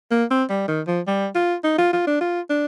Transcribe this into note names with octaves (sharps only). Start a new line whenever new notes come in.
A#3
C4
G3
D#3
F3
G3
F4
D#4
F4
F4
D4
F4
D4